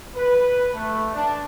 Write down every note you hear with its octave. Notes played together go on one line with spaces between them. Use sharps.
B4
A3
D4